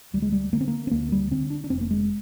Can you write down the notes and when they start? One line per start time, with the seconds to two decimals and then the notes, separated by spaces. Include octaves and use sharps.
0.13 D2 G3
0.22 G#3
0.32 G3
0.53 D3 A#3
0.61 C4
0.68 A#3
0.87 C4
0.91 D2 A#3
1.12 G3
1.32 D3 C4
1.50 D4
1.64 D4
1.70 F1 C4
1.81 A#3
1.91 G#3